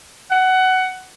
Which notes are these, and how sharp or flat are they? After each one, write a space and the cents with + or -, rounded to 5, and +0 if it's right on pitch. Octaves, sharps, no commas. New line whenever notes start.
F#5 +15